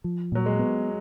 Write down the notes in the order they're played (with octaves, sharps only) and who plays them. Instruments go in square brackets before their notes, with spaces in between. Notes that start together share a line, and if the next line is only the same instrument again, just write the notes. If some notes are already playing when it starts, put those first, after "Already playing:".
[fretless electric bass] F3
[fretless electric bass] A#2 [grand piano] F#3
[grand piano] G#3
[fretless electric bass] B3